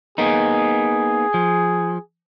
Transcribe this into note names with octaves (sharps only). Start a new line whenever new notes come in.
A#3 B3 D#4 G#4
F3